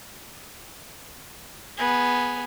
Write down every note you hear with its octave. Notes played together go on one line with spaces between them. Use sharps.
B3 G#4